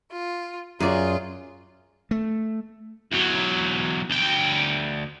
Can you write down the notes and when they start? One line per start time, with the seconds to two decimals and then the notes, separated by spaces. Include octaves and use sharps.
0.12 F4
0.80 F#2 F4 G#4 D5
2.11 A3
3.12 E2 F#3
4.10 D2 G5